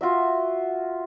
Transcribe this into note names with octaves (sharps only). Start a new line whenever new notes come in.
F4 F#4 E5